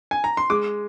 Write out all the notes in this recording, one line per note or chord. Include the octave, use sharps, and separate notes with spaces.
G#5
A#5
C6
G#3 D6